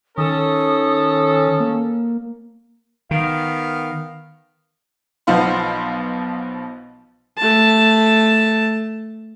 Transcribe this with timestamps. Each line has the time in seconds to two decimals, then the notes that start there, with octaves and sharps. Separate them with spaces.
0.18 D#3 C#4 A4 D#6
1.60 A#3
3.11 D#3 B3 F5
5.27 B1 B2 F3 B3 F5 C6
7.38 A3 A5